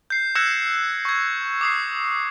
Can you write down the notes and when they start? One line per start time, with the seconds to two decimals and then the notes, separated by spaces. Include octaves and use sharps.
0.10 G6 C7
0.36 E6 F#6 G#6 A#6 C#7 E7
1.05 C#6 G#6
1.61 D6 D#6 C7